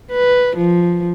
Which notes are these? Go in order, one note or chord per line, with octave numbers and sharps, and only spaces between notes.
B4
F3